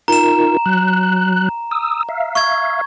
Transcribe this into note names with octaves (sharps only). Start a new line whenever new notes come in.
D#4 F4 A#4 A#5 E7
F#3 F#6
D#6 E6
E5 F5
C#6 G#6